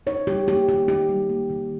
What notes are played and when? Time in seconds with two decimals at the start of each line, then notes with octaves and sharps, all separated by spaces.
0.07 D#4 C#5
0.27 G3 G4
0.47 A#3 G4
0.68 D#3 G4
0.88 D#4 G4
1.09 G3
1.29 A#3
1.50 D#3